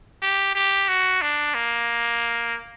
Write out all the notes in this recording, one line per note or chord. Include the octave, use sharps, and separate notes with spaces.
G4
G4
F#4
D4
A#3